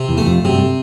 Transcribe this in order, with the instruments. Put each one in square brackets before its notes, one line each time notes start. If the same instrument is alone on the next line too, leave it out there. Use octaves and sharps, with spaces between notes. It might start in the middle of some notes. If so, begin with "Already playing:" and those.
Already playing: [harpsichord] C3
[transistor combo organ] E2
[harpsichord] A3
[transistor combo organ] F2
[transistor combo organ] F#2 [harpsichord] C3
[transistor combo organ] G2